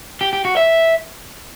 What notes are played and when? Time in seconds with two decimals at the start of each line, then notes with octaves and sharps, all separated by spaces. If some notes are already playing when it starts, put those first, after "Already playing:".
0.21 G4
0.33 G4
0.45 F#4
0.57 E5